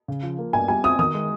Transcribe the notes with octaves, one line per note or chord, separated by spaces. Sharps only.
C#3
F3
A#3
G2 G#5
G3 G#5
C4 D#6
D#3 D#6
G#3